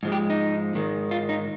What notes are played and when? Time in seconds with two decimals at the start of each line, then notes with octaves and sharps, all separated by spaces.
0.03 G#2 F3 G#3
0.12 G4
0.30 D#4
0.75 G#2 D#3 G#3
1.11 F4
1.29 D#4